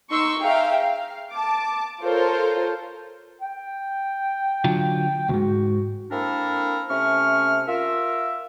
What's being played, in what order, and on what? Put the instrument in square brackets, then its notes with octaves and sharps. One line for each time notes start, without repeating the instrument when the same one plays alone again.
[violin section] D#4 C6 C#6 E6
G#4 E5 F5 G5 A#5
F5
A5 D6
F4 A4 A#4 C5 C#5
[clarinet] G5
[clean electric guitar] D3 F#3 F4
[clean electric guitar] D2 G#2 [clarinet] F#4
[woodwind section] A#3 C4 D4 E4 A4 A#4
C3 A3 C#4 C#6 F6
F4 A#4 E5